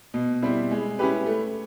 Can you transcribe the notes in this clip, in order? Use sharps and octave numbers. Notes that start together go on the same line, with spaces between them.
B2
G3 C4 E4
G#3
C#4 E4 G4 B4
A3